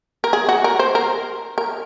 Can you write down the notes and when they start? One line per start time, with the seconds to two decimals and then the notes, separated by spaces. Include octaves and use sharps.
0.24 A#4
0.33 G#4
0.49 F#4
0.64 A#4
0.80 C5
0.95 A#4
1.58 A#4